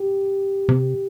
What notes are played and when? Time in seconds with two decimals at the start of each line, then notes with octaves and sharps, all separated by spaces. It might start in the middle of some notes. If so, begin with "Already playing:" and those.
Already playing: G4
0.69 C3